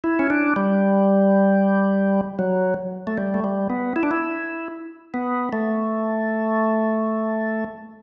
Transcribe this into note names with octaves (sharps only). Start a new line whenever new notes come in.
E4
C#4
D4
G3
F#3
A3
G3
A3
G3
B3
E4
D4
E4
B3
A3